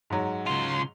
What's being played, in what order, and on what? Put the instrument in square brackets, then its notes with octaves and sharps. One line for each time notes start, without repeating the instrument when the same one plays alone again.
[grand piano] G#2 F#3
[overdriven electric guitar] C#3 F4 [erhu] C6